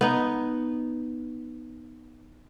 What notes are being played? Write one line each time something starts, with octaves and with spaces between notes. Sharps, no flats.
B3 D#4